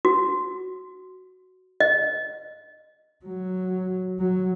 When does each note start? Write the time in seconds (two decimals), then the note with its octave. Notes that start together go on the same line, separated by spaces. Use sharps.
0.05 F#4
1.80 D#5
3.25 F#3
4.19 F#3